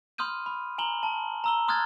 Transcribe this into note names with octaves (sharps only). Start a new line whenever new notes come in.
B5 C6 D#6 F6 G6 D#7
B5
G#5 A#5 F#7 G7
A5
A#5 E6 G7
C6 D#6 F6 F#6 G#6 A6